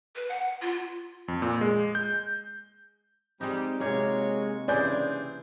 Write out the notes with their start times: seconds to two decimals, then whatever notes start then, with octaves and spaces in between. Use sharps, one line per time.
0.16 B4
0.29 F#5
0.62 F4
1.28 F2
1.42 A#2
1.61 G#3
1.95 G6
3.41 G3 G#3 C4 D#4
3.80 C3 G#3 A#3 F4 F#4 C#5
4.68 C#3 E3 C4 D4 G#4 D5 G#5 G6